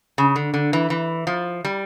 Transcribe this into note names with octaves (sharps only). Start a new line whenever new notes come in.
C#3
D3
D3
E3
E3
F3
G3